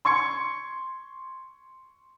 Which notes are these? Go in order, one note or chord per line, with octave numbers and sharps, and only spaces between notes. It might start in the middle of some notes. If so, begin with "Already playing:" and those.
C6 C#6 G#6 C#7